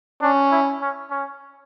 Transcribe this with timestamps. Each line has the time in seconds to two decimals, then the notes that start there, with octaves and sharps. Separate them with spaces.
0.22 C#4 D4
0.51 E4
0.81 C#4
1.11 C#4